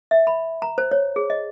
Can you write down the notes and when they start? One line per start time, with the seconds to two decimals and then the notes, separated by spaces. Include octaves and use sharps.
0.11 E5
0.27 B5
0.62 A#5
0.78 C5
0.91 C#5
1.16 G#4
1.30 D#5